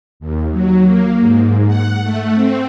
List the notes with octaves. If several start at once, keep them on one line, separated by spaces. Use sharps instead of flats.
D#2
F#3
A#3
G#2
F#5
A3
C4